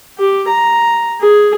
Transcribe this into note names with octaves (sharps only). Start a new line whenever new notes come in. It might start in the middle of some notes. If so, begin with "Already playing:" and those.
G4
A#5
G#4